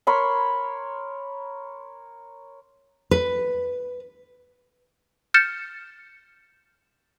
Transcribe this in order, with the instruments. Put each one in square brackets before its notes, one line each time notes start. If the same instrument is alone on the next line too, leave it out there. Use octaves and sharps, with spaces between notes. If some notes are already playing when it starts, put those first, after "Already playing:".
[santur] A#4 C#5 B5 C6
[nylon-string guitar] B4
[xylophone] F6 G6 A6 C#7 E7